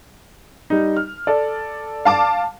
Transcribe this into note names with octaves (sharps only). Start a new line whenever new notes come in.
G3 D#4
F6
A4 D5
F5 A5 D6